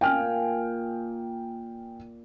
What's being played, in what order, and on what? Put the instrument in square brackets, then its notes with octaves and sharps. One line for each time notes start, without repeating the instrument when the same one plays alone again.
[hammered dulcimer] A#2 [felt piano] G5 G#5 F6